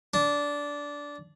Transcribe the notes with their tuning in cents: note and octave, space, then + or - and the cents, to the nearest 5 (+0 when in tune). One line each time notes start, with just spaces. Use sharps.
D4 -15